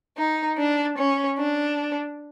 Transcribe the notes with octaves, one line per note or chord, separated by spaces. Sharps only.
D#4
D4
C#4
D4